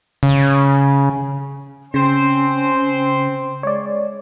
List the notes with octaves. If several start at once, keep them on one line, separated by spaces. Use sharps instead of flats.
C#3
C#3 C4 C#4 C5
G#3 C#5 D5